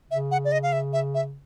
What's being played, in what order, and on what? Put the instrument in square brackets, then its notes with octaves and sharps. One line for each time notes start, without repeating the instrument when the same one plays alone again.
[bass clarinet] C#3 [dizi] E5
[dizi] F#5
D5
D#5
F5
E5
E5
E5